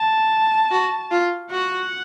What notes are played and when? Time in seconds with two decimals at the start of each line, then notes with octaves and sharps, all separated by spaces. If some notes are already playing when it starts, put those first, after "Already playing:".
Already playing: A5
0.71 F#4
1.11 F4
1.50 F#4 F#5